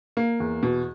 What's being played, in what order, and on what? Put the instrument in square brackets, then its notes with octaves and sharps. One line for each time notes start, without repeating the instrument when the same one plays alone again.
[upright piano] A#3
E2
B2